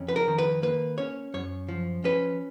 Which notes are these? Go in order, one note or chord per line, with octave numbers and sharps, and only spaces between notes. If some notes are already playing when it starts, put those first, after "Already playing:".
Already playing: F2 C#4
B4
A#4
D#3
B4
A#3 B4
C#4 C#5
F#2 C#5
F3
C#4 B4